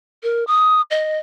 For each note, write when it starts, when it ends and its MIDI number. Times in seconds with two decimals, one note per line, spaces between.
0.23 0.44 70
0.47 0.81 87
0.91 1.17 75